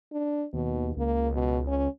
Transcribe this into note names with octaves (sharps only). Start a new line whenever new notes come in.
D4
D#2 B2
C#2 A#3
B2
C#4